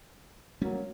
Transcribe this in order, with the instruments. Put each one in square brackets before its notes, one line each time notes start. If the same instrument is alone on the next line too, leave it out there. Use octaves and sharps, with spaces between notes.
[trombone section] F#3 A#3 [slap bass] G3 A3 C#4